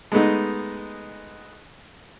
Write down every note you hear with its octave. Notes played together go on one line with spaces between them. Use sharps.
G#3 A3 B3 D#4